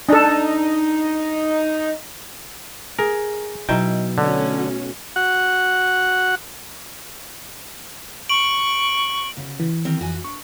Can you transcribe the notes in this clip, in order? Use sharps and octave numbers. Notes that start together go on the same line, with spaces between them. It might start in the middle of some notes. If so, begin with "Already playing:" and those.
D4 D#4 A4
G#4 A#4
B2 F#3 D#4 E4 G5
D3 A3 C#4 F#4
F#4 F#5
C#6 D7 F#7
D2 C#3
E3
D#3 C4 A#4
F2 F#4 G#5
D4 C#6